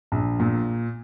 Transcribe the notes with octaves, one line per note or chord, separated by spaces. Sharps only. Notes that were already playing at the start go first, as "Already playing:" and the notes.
A#1
A#2